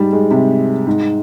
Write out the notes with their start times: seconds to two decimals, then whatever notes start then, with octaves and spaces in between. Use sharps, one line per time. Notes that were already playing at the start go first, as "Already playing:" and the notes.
Already playing: G#2 G3
0.13 G#3
0.31 C3
0.87 G#2